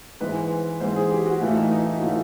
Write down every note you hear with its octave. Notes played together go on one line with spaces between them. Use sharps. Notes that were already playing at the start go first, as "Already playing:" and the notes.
G#2 E3 G#3 C4 B4
G#2 E3 G#3 C4 C5
G#4
G4
F#4
A2 E3 A3 F4
D#4
D#4
E4
F#4
A2 E3 A3 F4